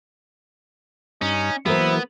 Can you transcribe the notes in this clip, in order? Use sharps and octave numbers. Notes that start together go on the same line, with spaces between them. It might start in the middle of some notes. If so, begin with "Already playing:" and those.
G2 C#4 D#4
E3 F#3 A#3 B3 E4 G#4 A#4 C5